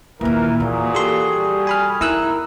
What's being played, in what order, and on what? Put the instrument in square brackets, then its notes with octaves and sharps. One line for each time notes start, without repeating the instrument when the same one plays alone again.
[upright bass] D#2 A#2 [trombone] E3 [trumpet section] A#4
[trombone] A#2 [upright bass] E3 [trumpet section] F#4 G#4
[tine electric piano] G4 A4 C6
[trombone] G3
[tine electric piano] G#5 B5 F6
[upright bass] D#4 [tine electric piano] E4 E6 F#6 [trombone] A#4